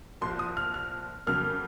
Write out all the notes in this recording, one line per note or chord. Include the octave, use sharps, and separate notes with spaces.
C2 A#2 F3 C6
D#6
F6
F6
F2 C#3 F#3 A#3 F6